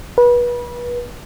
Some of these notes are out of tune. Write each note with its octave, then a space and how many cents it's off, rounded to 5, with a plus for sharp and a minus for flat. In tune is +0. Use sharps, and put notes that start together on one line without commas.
B4 -30